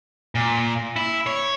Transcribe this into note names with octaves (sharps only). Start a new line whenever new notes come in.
A#2
E4
C#5